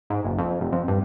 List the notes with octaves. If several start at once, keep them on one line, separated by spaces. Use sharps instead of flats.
G#2
F#1
F2
F1
F2
G2